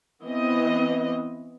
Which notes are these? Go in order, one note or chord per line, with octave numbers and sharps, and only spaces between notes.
E3 B3 C4 D#5